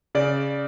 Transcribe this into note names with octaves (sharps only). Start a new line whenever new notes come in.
C#3 D5